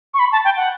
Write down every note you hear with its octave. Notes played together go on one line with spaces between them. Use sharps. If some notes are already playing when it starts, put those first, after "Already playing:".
C#6
B5
A5
G5
F#5